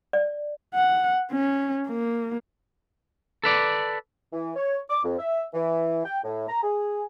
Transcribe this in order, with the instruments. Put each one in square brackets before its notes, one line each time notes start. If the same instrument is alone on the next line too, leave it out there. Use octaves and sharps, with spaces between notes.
[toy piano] D5
[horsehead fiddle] F#5
C#4
A#3
[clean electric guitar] A4 B4 D5
[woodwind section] E3
C#5
D6
F2
E5
E3
G5
A2
A#5
G#4